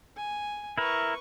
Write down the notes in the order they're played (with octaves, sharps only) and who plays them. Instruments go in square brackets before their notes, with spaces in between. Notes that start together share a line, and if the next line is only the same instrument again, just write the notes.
[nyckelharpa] G#5
[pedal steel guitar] E4 A#4 [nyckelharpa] B4 C#6